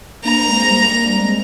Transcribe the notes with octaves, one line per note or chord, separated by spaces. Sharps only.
A#3 D4 A#5
G#3 C4
G3 A#3
D4
G#3 C4